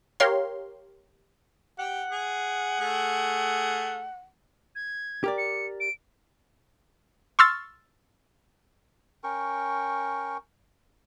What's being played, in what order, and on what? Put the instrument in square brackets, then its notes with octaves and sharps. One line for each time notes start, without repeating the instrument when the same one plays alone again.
[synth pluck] G4 A#4 C#5 F5 C6
[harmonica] G4 [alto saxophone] F#5
[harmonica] G#4
A3 G#4
[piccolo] G#6
[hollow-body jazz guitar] G4 A#4 D5
[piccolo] C#7
D7
[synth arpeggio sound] C6 C#6 E6 F6 A6
[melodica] C#4 A#4 G5 C#6